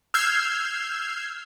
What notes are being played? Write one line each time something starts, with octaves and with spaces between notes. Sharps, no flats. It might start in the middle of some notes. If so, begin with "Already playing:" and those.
E6 F6 G6 G#6 C7